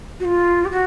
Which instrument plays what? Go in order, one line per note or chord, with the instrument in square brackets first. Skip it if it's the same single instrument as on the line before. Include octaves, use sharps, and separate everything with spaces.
[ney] F#4
F4
G4
F#4